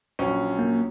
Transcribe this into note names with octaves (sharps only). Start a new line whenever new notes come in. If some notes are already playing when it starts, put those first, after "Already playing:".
A#1 F#3 C#4
A#3